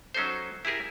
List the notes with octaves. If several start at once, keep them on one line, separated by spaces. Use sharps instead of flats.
F#3 C#4 D#4 A4 C5
E4 G4 G#4 A#4 E5